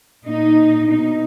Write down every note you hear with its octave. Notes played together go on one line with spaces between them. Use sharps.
A#2 D#4
B2 D#4